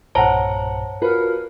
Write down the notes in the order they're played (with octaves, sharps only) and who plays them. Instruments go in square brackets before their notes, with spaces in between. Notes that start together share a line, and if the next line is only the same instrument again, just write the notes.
[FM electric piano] B1 G2 A#2 [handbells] C5 C#5 A5 [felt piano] F#5 A#5
[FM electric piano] F4 F#4 [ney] A#4 [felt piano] B4